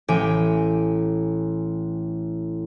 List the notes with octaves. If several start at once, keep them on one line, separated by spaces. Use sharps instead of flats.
A1 G4 G5 G#5